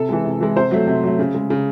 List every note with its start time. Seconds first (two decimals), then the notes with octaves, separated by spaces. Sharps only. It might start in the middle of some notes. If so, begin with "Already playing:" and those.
Already playing: C3 A4
0.09 E3 G#3
0.25 C3
0.41 E3 G#3
0.56 C3 C5
0.71 F#3 A3
0.87 C3
1.04 F#3 A3
1.19 C#3
1.34 G#3
1.50 C#3